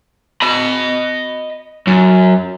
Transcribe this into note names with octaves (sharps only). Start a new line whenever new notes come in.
D#5 B5
F#2